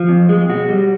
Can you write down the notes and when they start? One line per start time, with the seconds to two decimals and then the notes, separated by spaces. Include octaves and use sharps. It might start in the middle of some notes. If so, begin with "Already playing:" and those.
Already playing: F3
0.09 F2
0.29 G#3
0.49 B2 F#4
0.69 G3